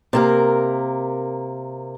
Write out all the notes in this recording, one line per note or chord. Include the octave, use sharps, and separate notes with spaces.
C3 A#3 A#4